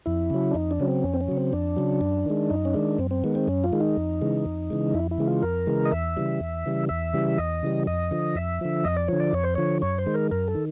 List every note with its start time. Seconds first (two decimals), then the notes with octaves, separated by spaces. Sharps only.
0.06 F2 E4
0.30 C#3 F#3
0.51 D4
0.55 F2 D#4
0.71 D4
0.80 C#3 F#3 C#4
0.88 C4
1.04 F2 C#4
1.14 C4
1.21 C#4
1.28 C#3 F#3
1.37 C4
1.53 F2 D4
1.77 C#3 F#3
2.01 F#2
2.26 D#3 G#3
2.50 F#2 D#4
2.65 C#4
2.74 D#3 G#3 D4
2.99 F#2 C4
3.11 C4
3.24 D#3 G#3 B3
3.35 C4
3.48 F#2 C#4
3.64 F4
3.73 D#3 G#3
3.80 D#4
3.97 F2
4.21 C#3 E3 G#3
4.46 F2
4.70 C#3 E3 G#3
4.94 F2 E4
5.11 E4
5.18 C#3 E3 G#3
5.27 F4
5.43 F2 A#4
5.67 C#3 E3 G#3
5.85 D#5
5.92 E2 E5
6.16 C#3 E3 G3
6.40 E2
6.66 C#3 E3 G3
6.89 E2 E5
7.13 C#3 E3 G3
7.38 E2 D#5
7.63 C#3 E3 G3
7.87 F2 D#5
8.11 D3 F3
8.35 F2 E5
8.61 D3 F3
8.85 F2 D#5
8.97 D5
9.08 D3 F3 C#5
9.20 D5
9.33 F2 C#5
9.44 C5
9.55 D3 F3 C#5
9.82 F#2 C#5
9.98 C5
10.06 D#3 G#3
10.14 A#4
10.31 F#2 A#4
10.48 A4
10.55 D#3